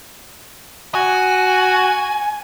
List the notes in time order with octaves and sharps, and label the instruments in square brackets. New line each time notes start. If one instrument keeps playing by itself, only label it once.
[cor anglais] F#4 [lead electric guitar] G#5